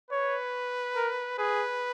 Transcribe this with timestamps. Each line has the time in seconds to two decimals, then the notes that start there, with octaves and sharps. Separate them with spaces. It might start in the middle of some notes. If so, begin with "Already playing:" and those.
0.11 B4 C#5
0.96 A#4
1.38 G#4 B4